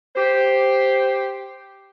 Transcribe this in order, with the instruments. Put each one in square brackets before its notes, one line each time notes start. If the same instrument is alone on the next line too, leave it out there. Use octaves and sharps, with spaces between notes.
[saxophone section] G4 C5